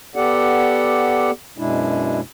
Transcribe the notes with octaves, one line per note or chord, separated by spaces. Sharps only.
B3 G4 A4 D5 F#5
F#2 B2 G#3 D4 E4